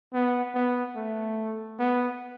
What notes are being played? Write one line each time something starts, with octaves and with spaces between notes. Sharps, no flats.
B3
B3
A3
B3